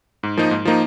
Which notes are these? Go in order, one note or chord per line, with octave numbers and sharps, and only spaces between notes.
G#2
F3 A#3 D#4
G#2
F3 A#3 D#4